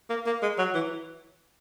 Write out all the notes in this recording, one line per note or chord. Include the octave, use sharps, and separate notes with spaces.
A#3
A#3
G#3
F#3
E3